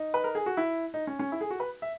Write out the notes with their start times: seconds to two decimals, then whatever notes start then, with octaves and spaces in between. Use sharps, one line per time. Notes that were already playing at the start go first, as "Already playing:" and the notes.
Already playing: D#4
0.14 B4
0.24 A#4
0.35 G#4
0.46 F#4
0.57 E4
0.94 D#4
1.07 C#4
1.19 C#4
1.32 E4
1.41 G#4
1.50 F#4
1.60 B4
1.82 E5